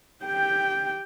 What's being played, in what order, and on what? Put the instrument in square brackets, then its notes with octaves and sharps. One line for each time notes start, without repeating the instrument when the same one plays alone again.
[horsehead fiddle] G4 G5